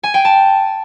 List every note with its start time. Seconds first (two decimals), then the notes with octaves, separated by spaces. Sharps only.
0.03 G#5
0.14 G5
0.25 A5